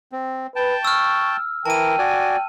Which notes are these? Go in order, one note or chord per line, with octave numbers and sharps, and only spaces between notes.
C4
B4 G5 A5
C#6 E6 F6
E3 A#4 G5 A5 D#7
F#4 D5 G#5